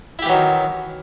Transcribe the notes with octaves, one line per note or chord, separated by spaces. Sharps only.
D#3 E3 F#3 E4 G4